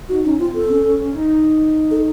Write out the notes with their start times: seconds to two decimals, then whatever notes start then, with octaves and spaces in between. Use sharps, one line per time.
0.09 D#4 F#4
0.24 C#4 D#4
0.39 C4 F4
0.54 C4 A4
0.69 C#4
0.85 C#4
0.99 C#4
1.15 D#4
1.91 A4